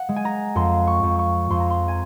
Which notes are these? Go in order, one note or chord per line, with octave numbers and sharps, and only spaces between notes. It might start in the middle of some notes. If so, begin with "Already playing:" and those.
Already playing: F#5
G#3
G#5
A#5
F2 C6
C#6
F2
C#6
F2 C6
A#5
C6
G#5